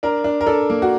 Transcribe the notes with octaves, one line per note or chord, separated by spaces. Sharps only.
D4 A#4
D4
A#4
D4 A4
A#3
F#4